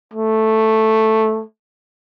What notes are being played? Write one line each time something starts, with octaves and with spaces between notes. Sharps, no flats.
A3